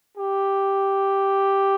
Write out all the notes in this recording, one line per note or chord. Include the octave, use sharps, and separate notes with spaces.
G4